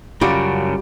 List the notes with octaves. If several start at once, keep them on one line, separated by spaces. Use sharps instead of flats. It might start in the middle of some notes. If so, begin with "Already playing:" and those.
F#2 C#3 G3 F4 F#4